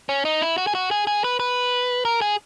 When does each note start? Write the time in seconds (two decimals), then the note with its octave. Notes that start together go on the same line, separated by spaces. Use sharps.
0.09 C#4
0.25 D#4
0.41 E4
0.58 F#4
0.67 G#4
0.75 F#4
0.91 G#4
1.07 G#4
1.24 B4
1.40 B4
2.05 A#4
2.21 G#4